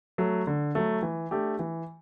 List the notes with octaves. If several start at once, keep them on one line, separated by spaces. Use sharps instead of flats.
F#3 A3
D3
F#3 A3
E3
A3 D4 G4
E3